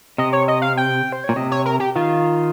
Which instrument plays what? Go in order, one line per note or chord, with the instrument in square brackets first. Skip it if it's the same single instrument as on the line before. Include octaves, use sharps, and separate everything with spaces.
[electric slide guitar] C3 [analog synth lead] D#5
[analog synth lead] C#5
D#5
F5
G5
C5
C#5
[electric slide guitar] A#2
[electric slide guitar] C3 [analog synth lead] D#5
[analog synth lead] C#5
A#4
G4
[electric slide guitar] D#3 [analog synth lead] F4